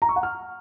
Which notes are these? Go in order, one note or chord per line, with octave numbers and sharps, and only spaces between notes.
A#5
C#6
F#5
F6